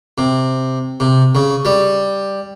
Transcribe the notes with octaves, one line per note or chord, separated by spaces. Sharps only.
C3
C3
C#3
G3